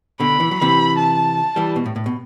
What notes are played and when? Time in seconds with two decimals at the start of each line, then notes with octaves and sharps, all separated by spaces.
0.20 B2 D3 B5
0.40 E3
0.51 F#3
0.59 C3 E3 B5
0.98 A5
1.56 E3 G3
1.76 B2
1.86 A2
1.96 A2
2.06 B2